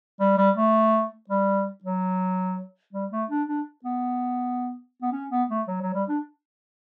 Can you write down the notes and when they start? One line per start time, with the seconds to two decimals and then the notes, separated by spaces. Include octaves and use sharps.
0.20 G3
0.37 G3
0.56 A3
1.29 G3
1.83 F#3
2.93 G3
3.12 A3
3.30 D4
3.47 D4
3.84 B3
5.02 B3
5.12 C#4
5.30 B3
5.49 A3
5.67 F#3
5.81 F#3
5.94 G3
6.08 D4